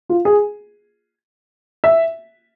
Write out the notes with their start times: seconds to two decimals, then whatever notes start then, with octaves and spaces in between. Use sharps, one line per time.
0.09 F4
0.25 G#4
1.84 E5